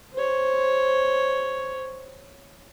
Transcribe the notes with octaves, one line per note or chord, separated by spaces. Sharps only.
C5 C#5